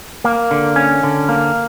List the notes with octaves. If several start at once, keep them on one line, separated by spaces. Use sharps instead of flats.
A#3
D3
C#4
D3
A#3